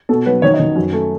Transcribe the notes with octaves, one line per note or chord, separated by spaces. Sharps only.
B2 A4
F#3 B4
D#3 C#5
D#5
D#3
F#2
A3